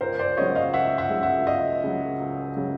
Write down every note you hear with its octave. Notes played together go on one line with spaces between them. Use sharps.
C#2 A#4 C5
C5 D5
C#3 F#3 C#5 D#5
D#5 F5
C#2 E5 F#5
E5 F#5
C#3 F#3
E5 F#5
C#2 D#5 F5
C#3 F#3
C#2
C#3 F#3